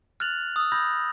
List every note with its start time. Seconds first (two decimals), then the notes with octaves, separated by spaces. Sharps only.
0.20 F6 F#6 A6 F7 F#7
0.56 D#6 E6
0.72 B5 D#6 E6 G6 A6 A#6